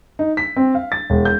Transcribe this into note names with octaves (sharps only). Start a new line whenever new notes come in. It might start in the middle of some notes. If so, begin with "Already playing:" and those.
D#4
B6
C4
F5
A6
E1
G6